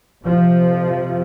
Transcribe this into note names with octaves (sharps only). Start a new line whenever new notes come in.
F2 C3 F3